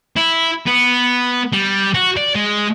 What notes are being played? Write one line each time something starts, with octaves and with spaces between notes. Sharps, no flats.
E4
B3
G3
F#4
D5
G#3